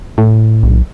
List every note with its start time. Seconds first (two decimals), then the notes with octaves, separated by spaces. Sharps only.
0.18 A2
0.63 B1